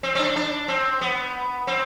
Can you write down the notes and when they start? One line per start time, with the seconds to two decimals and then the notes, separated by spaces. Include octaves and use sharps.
0.03 C4
0.15 C4
0.19 D4
0.36 D4
0.68 C4
1.01 B3
1.67 C4